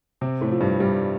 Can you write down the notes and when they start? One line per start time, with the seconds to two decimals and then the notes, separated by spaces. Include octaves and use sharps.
0.21 C3 C4
0.41 A2 A3
0.51 F3
0.60 G2 G3
0.80 G2 G3